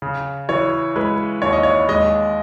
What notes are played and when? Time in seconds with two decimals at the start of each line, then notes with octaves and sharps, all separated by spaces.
0.02 C#3
0.49 E3 C#5
0.96 G#3 B4
1.42 D#2 C#5
1.53 D#5
1.63 C#5
1.89 G#3 D#5